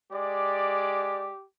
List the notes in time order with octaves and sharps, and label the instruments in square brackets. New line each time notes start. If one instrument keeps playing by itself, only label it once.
[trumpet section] G#3 D5 [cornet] G4